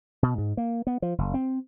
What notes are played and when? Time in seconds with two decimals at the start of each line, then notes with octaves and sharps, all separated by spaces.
0.23 B2
0.38 G#2
0.57 A#3
0.87 B3
1.02 F3
1.18 F#1
1.34 C4